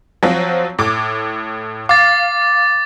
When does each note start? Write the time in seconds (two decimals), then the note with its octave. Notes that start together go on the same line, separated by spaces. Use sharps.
0.23 F3 F#3 C4
0.79 A2 D6
1.89 F5 D6 A6